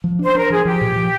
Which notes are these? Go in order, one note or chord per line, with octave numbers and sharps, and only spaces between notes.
F3
D4 C5
D4 A#4
F3 G#4
F3 G4
A#2
F3